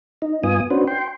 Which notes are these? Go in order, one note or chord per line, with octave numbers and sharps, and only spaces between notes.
D#4
G2 B3 F4 G#5 D#6
C#4 D4 F#4 B4 C5
G5 C6